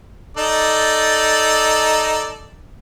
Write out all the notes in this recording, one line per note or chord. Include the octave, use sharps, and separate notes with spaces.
D#4 A4 D5